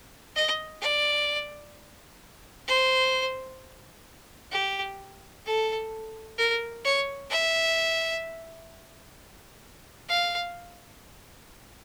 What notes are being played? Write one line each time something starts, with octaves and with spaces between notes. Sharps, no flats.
D#5
D5
C5
G4
A4
A#4
C#5
E5
F5